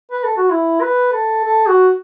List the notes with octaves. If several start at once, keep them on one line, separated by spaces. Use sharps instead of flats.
B4
A4
F#4
E4
B4
A4
A4
F#4